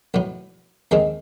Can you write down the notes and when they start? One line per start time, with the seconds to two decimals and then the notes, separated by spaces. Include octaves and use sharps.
0.14 B1 A2 F#3 B3
0.91 D#2 D#3 G#3 C4 D#4